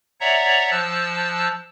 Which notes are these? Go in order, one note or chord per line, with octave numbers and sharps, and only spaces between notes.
C#5 D5 E5 F#5 A#5
F3 A5 E6 F#6